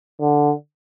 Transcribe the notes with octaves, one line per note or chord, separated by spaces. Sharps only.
D3